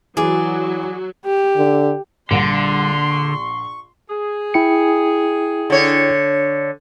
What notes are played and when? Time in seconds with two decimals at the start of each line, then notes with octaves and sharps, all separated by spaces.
0.17 E3 F#3 F#4 G#4 D5
1.25 G4
1.57 D3
2.31 A#1 D3 G3 F#5 C6 A#6
3.11 C#6
4.10 G#4
4.54 E4 G5 C#7
5.70 D3 C#5